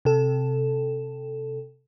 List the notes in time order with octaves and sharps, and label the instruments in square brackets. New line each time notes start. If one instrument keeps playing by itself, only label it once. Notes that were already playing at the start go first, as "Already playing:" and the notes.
[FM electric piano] C3 A4